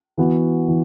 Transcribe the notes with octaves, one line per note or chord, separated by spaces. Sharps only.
E3 B3 F#4
E3